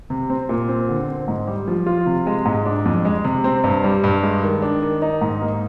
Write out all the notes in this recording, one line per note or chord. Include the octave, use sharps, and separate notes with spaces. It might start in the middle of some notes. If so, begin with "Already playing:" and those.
C3
C4
A#2
C4
D3
C4
G#2
G3
F3
F4
C3
G#3
G#2
D4
F2
G#3
C3
C4
G2
G3
G2
G#3
D#3
D4
D#3
D#4
G#2
A#3